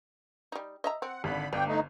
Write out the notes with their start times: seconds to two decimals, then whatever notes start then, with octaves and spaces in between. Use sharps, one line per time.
0.52 G3 D#4
0.84 D#5 E5 A#5
1.02 C4 F#5
1.24 G#1 D3 B5
1.53 G1 D5 G5 D6
1.68 A3 D#4